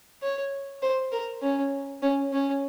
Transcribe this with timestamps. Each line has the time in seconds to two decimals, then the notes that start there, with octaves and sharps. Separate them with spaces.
0.22 C#5
0.82 C5
1.12 A#4
1.42 C#4
2.02 C#4
2.32 C#4